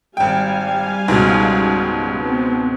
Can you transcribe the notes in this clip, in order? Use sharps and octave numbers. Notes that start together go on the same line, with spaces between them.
G#1 G3 F5 G5 G#5
C#2 G#2 B2
B3 C4